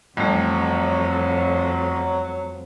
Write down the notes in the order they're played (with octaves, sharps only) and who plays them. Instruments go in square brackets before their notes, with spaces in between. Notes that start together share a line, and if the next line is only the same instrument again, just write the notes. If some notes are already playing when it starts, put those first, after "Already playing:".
[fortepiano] A1 [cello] F2 [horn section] F#3 [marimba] G3 A3